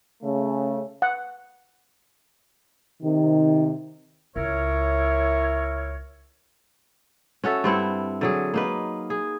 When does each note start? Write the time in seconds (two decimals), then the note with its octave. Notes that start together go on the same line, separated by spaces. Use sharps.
0.22 C#3 A3
1.02 F#5
3.02 C3 D#3
4.36 C#2 E4 A#4 C#5
7.44 C#4 F#4 A4 E5
7.64 G2 C4 E4 F#5
8.21 D3 F#3 G#4
8.54 A#3 D#4 B4
9.10 G#4